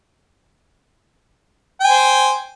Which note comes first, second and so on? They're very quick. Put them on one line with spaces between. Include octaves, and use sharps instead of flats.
G5 G#5 C5